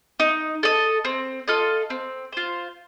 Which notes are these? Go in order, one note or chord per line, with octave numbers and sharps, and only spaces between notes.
D#4
A4 D#5
C4
F4 A4 D#5
C4
F4 C5